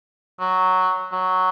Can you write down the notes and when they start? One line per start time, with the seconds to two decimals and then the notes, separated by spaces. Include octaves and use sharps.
0.40 F#3
1.12 F#3